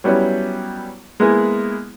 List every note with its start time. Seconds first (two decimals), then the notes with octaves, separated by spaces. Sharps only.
0.04 F#3 G3 B3 C#4 E4
1.20 G#3 A#3 B3 E4 G#4